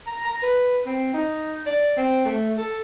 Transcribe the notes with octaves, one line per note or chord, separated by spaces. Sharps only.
A#5
A#5
B4
C4
D#4
D5
C4
A3
A4